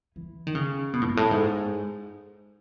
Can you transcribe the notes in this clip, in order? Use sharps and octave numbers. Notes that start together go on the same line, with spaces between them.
E3
D#3
C#3
B2
A2
G#2
A2
G#2